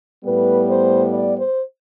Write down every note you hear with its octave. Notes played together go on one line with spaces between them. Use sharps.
A2 G3 B3 B4
C5
D5
C5